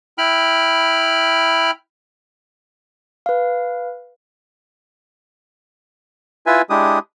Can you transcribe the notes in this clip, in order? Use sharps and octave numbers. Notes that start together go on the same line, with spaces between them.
E4 G5 B5 F6
B4 F5
E4 F4 B4 E5 G#5
G#3 D4 E4 G4 D#6